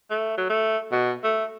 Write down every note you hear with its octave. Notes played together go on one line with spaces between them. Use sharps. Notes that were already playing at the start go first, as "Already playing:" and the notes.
A3
F#3
A3
B2
A3